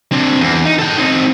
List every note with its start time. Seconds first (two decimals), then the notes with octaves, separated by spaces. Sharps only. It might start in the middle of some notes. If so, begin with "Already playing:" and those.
0.12 C4 D4
0.40 E2
0.66 D#4
0.79 A4 G5
0.98 C4 D#4